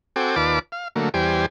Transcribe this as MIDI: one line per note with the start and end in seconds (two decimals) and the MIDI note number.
0.16 0.36 60
0.16 0.36 66
0.16 0.36 69
0.16 0.36 79
0.16 0.36 80
0.16 0.36 86
0.36 0.59 39
0.36 0.59 65
0.36 0.59 71
0.36 0.59 74
0.36 0.59 81
0.36 0.59 86
0.72 0.88 77
0.96 1.09 50
0.96 1.09 54
0.96 1.09 57
0.96 1.09 58
1.14 1.46 40
1.14 1.46 55
1.14 1.46 67
1.14 1.46 72
1.14 1.46 74
1.14 1.46 80